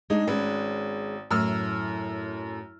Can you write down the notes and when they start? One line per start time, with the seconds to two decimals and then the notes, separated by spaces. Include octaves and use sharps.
0.10 G#3 D4 D#4 G#4
0.28 G#1 G#3 C#4 B4
1.31 F#2 A2 E6 F6